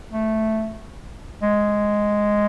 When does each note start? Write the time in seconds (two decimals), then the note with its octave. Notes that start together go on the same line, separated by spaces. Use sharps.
0.12 A3
1.42 G#3